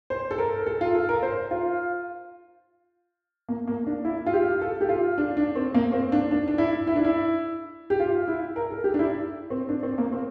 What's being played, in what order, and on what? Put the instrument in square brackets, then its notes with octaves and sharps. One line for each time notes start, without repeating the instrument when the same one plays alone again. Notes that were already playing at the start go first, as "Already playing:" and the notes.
[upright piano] C5
A4
A#4
A4
F4
A4
A#4
C5
F4
A#3
A#3
D4
E4
F4
G4
A4
G4
F4
D4
D4
C4
A#3
C4
D4
D4
D4
E4
E4
D4
E4
G4
F4
E4
A#4
A4
G4
D4
E4
C4
D4
C4
A#3
C4